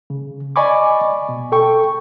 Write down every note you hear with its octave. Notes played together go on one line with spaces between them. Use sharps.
C#3
D5 D#5 G#5 B5 C#6 D6
B2
A4 G5 C#6